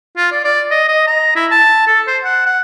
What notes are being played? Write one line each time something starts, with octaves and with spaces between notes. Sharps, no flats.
F4
D5
D5
D#5
D#5
A#5
E4
A5
A4
C5
F#5
F#5